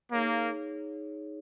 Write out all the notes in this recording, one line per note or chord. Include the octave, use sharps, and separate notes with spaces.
A#3 D#4 G#4 C#5